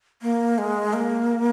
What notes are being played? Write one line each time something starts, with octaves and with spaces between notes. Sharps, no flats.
A#3
G#3
A#3